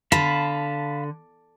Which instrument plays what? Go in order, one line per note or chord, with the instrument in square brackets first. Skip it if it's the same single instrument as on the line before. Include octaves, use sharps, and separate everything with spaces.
[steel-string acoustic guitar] D3 [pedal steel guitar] F5 A5 B5